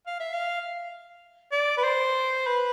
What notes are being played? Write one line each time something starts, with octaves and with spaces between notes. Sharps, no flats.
F5
E5
F5
D5
B4
C5
B4